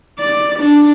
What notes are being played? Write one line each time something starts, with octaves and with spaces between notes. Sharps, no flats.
D5
D4